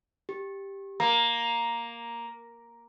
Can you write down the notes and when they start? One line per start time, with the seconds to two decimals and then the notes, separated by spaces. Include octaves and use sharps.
0.29 G4
1.00 A#3 A#5